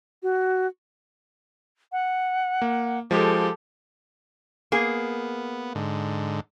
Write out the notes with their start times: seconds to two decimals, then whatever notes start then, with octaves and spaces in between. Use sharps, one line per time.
0.23 F#4
1.92 F#5
2.62 A#3
3.11 F3 G#3 G4 A4
4.72 A#3 B3 G#4
5.75 G#2 D3